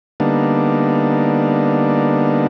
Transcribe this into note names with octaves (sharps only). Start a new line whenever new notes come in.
D3 G3 A#3 B3 D4 D#4